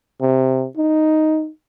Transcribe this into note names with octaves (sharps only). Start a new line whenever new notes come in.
C3
D#4